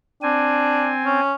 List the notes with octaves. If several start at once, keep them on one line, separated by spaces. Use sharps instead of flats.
C4 D4 G#5
C#4